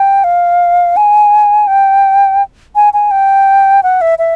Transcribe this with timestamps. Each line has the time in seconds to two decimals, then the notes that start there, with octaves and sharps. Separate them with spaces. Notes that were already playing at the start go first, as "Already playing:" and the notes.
Already playing: G5
0.24 F5
0.96 G#5
1.67 G5
2.75 G#5
2.93 G#5
3.11 G5
3.83 F#5
4.01 E5
4.18 E5